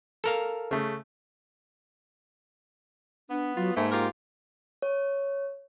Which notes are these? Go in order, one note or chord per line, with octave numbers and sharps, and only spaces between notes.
A4 A#4 F5
C#3 A3
B3 D4
F#3 F4
G#2 A3 A#3
F4 G4 A#4
C#5